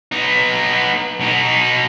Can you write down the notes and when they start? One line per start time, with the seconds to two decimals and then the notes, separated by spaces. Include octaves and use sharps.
0.12 B3 D#4
1.21 B2 D#4